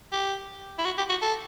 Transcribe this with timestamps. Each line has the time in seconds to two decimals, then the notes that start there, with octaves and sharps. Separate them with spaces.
0.12 G4
0.79 E4
0.85 F#4
0.98 G4
1.09 F#4
1.22 A4